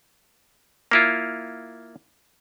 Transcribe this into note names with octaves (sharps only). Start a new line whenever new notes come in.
A#3 E4 F4